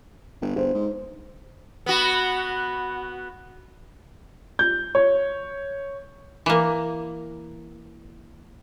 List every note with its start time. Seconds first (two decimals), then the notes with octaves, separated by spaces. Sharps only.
0.42 G1
0.56 G1 C5
0.74 G#2
1.86 B3 F#4
4.59 G6
4.95 C#5
6.46 E3 A#3